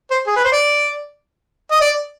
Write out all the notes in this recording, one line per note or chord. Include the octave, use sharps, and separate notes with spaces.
C5
G#4
B4
C5
D5
D#5
D5